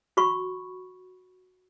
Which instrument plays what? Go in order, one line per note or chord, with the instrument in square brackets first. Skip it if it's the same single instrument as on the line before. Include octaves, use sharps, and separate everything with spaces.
[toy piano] F#4 B5 C#6